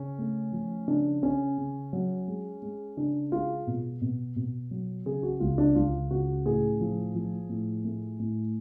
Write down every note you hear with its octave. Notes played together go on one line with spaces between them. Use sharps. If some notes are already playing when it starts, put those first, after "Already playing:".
Already playing: C#3 C#4
A3
F3
C#3 D4
C#3 C#4
C#3
F#3
G#3
G#3
C#3 D4
G#3 F4
B2
B2
B2
F#3
C#3 G#4
F#4
C#2 F4
D4
C#2 F4
C#3 F#4
A2 G#4
F3
F3
A2
A3
A2